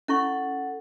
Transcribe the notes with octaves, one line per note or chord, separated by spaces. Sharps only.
C#4 E4 A4 F#5 C#6